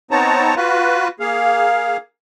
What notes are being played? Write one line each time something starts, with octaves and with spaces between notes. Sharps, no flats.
B3 C4 D#4 C#5 A5 A#5
F4 F#4 B4
A#3 G#4 F5